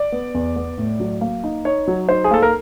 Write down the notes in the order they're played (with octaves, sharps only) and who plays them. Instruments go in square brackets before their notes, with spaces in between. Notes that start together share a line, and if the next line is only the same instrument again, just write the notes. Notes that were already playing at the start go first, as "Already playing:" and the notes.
Already playing: [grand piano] D5
B3
E2
B3
A2
F#3
A#3
D#4
D#4 C#5
F#3
D#4 C5
G#4
A#3 A4
A#4